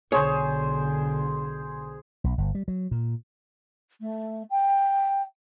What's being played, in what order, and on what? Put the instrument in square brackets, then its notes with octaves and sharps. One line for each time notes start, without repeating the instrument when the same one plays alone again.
[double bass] B1 D3 [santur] G#4 C5 [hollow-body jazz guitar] C#5
[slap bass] B1
G1
G3
F#3
A#2
[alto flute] A3
G5